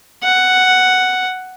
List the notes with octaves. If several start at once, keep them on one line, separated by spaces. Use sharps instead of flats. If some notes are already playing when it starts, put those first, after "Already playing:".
F#5